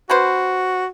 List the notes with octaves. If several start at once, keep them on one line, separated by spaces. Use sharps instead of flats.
C#4 F#4 B4 C5